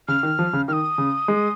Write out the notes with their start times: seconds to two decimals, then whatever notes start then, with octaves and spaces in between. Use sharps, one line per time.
0.08 C#3 F6
0.23 D#3
0.39 F3
0.53 C#3
0.68 D#3 F6
0.73 D#6
0.98 C#3
1.28 G#3